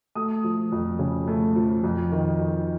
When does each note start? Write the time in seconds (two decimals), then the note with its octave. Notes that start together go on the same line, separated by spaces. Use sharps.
0.15 A3 D#6
0.44 F3
0.72 F2
0.99 C#3
1.27 A3
1.56 F3
1.84 F2
2.12 D#3
2.40 F2